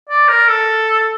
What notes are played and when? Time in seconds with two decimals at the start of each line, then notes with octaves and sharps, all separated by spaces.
0.09 D5
0.29 A#4
0.48 A4